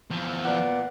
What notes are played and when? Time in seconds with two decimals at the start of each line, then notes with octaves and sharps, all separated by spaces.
0.11 E2 F3
0.45 A#2 B3 D5 F#5